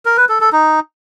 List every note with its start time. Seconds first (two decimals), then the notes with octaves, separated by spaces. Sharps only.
0.05 A#4
0.17 B4
0.29 A4
0.41 A4
0.52 D#4